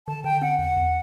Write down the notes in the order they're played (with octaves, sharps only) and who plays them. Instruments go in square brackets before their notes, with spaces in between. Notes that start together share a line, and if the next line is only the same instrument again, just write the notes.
[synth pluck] D3 [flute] A5
[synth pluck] D3 [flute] G5
[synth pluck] C4 [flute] F#5
[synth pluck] E2 [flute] F#5
[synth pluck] E2